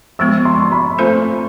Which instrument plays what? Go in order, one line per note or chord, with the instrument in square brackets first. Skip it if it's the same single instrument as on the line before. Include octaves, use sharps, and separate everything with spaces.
[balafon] F3 G#3 B3 [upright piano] E6
[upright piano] C6
C#6
C6
B5
[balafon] A3 C4 F4 A4 C5